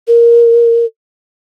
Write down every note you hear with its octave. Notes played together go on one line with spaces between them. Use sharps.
A#4